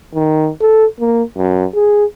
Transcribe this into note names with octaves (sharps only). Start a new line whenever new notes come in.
D#3
A4
A#3
F#2
G#4